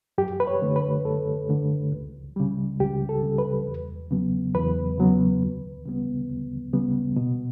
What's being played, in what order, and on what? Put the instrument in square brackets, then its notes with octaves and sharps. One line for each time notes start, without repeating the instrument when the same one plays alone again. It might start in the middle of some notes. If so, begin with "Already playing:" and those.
[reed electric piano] F#2 G4
B4
C#5
D3 A3
B4
F#2 A4
D3 A3
C#2
C#3 G3
C#2 G4
A4
C#3 G3
B4
E2
C#3 F#3 B3
E2 B4
C#3 F#3 B3
D2
C#3 G3 B3
D2
C#3 G3 B3
B2